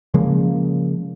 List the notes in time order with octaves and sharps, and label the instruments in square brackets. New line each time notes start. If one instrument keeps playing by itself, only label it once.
[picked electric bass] C#3 F3 G#3 A#3